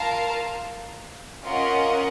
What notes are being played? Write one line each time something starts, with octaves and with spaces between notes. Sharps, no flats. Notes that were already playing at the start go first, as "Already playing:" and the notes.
Already playing: F4 A#4 F5 A5
C#4 F4 A#4 D#5 F#5